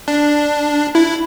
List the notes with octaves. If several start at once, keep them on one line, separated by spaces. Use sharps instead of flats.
D4
E4